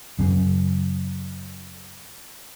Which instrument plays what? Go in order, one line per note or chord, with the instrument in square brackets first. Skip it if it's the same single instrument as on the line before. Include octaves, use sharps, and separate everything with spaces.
[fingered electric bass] F#2 C#3